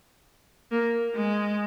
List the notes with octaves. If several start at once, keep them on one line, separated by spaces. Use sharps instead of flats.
A#3
G#3